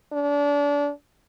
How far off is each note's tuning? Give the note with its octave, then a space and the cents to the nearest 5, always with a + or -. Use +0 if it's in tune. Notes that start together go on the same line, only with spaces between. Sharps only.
D4 -30